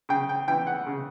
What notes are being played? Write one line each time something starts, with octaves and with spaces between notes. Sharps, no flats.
C#3 G5
G5
E3 G5
F#5
C#3